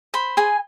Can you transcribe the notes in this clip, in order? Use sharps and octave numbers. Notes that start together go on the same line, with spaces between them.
C5 B5
G#4 G#5